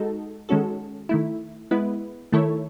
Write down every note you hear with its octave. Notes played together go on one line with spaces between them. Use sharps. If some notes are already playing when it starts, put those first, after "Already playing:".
Already playing: G#3 D#4 F#4 A4
D#3 G#3 C#4 F#4 A4
D#3 A3 E4
G#3 B3 E4 B4
D#3 A3 E4 A4 C#5